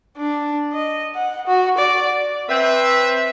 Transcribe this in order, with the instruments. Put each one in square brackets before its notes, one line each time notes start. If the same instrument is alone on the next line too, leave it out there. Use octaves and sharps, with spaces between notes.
[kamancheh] D4
D#5
F#5
F#4
D5
[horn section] C4 B4 E5